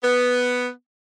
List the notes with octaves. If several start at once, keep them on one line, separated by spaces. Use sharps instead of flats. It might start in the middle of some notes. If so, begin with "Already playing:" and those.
B3